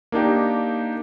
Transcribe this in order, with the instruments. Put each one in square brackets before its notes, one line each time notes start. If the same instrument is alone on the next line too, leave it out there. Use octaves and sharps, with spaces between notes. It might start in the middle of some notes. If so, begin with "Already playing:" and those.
[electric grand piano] A#3 D4 D#4 G4